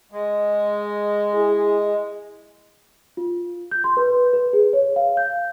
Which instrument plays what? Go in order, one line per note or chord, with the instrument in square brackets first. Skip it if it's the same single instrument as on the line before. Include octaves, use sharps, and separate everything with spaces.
[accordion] G#3
[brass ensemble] E4 G#4
[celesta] F4
G6
C6
B4
B4
G#4
C#5
F5
G6